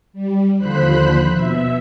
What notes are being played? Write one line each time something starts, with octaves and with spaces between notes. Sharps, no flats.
G3
D#2 D3 F3 C5 B5 F#6
B2 E5